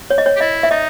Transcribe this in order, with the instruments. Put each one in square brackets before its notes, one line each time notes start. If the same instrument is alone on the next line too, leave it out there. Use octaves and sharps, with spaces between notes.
[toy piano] C#5
D#5
C#5
[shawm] G4
[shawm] E4 [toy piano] D#5
[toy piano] E5
[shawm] D#4 [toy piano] D#5